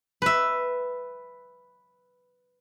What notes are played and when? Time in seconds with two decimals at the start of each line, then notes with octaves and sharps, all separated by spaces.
0.22 B4 E5